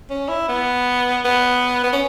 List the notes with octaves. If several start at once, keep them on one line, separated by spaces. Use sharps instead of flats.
C#4
E4
B3
B3
B3
C#4